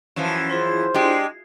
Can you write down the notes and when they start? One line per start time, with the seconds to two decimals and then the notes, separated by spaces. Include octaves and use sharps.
0.16 F#2 E3 F3 C#4
0.50 E4 F4 G#4 C5
0.94 G#3 D4 G4